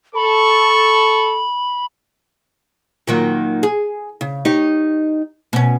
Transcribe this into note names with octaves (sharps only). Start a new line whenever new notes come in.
A4 B5 C#6
A#2 D#3 F#3
G#4
C#3
D#4 G4 C#5
B2 C#4